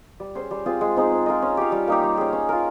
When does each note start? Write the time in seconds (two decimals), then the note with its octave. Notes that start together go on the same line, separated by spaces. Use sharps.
0.20 G3
0.35 C#4 G#4 C5
0.51 G3
0.66 C4 F4 G#4
0.81 G#3
0.96 C4 D#4 G#4
1.11 C4
1.26 F4 A#4 D#5
1.42 C#4
1.57 G4 C#5 F5
1.72 G3
1.88 A#3 D#4 G4
2.03 G3
2.18 C#4 G#4
2.33 C#4
2.49 F4 A#4